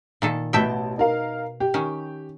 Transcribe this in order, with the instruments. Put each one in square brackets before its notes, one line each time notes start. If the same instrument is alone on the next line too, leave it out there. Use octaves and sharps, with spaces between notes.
[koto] A#2 D#3 A4
[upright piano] A1 A5 [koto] B2 E5 G5
[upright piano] D#4 A#4 F5
G4
[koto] D#3 C#4